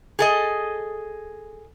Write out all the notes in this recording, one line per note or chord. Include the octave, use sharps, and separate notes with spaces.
G#4 A4 D#5